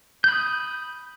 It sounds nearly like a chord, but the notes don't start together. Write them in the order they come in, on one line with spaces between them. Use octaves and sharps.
G6 B5 D#6